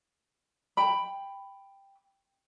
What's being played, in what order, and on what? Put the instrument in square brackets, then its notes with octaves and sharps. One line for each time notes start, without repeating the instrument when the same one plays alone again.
[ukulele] G5 B5